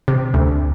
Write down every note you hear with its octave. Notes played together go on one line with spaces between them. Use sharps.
C3
D2